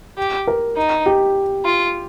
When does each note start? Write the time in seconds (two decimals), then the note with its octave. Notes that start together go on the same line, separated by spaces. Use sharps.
0.18 G4
0.47 A#4
0.76 D#4
1.06 G4
1.65 F4